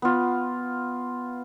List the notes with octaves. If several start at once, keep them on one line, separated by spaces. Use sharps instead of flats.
B3 F4